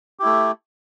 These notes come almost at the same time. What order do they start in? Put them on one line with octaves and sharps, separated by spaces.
G4 E4 A3